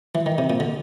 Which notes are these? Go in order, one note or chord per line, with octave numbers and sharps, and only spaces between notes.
E3
D#3
C3
A#2
D3